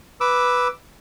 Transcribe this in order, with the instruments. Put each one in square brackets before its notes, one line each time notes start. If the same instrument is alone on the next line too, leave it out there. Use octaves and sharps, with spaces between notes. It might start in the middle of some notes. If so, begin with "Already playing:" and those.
[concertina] B4 D6 E6